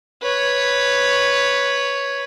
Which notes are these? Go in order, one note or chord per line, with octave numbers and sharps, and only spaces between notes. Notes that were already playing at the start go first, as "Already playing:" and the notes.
B4 C#5